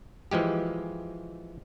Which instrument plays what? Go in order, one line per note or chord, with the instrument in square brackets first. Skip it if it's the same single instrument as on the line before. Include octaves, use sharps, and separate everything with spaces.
[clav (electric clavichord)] E3 F3 G#3 G4